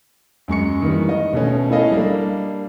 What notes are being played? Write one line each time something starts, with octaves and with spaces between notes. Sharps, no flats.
F#2 G#3 C#6 C#7
D#3 E3 G3
D#5
B2 A3 C#4
E4 G#4 A4 D#5 F5
G3 A#3 D4